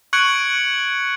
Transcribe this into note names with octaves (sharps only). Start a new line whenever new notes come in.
C#6 F#6 G#6 C#7 D7 F#7